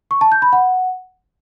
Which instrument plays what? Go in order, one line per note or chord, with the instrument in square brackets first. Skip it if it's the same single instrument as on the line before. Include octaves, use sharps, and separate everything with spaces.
[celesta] C#6
A5
G6
B5
F#5